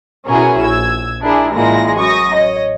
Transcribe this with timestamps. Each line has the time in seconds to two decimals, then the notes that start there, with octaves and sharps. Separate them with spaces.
0.28 B2 C#4 E4 F#4 G#4 A#4
0.59 A#1 E6 G#6
1.22 D4 E4 G#4 A#4
1.54 A1 A#2 G#3 E4 A#6
1.98 F#2 C#6 D#6 A#6
2.35 C#5 D#5